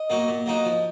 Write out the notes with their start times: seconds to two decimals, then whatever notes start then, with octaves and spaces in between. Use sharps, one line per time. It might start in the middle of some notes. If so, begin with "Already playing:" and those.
Already playing: D#5
0.10 F#3 A#3 D#4 F#4
0.28 A#2
0.46 F#3 A#3 D#4 F#4
0.65 F3 D#5